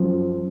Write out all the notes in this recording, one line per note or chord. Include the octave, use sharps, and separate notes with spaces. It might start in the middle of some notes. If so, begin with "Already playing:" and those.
Already playing: F#2 F3